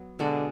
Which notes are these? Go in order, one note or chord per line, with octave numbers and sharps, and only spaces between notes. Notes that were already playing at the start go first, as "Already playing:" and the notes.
Already playing: F#3 B3
B2 D3 G#3 D4 F#4